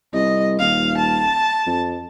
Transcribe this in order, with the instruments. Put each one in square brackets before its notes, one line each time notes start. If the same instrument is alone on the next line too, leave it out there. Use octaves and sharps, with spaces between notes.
[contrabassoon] C2 [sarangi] D#5
[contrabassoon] D#1 [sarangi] F5
[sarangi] A5
[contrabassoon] F2